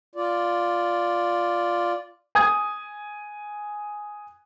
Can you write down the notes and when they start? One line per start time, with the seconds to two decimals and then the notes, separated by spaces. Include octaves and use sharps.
0.15 F4 D5
2.35 G#5 D#6 G#6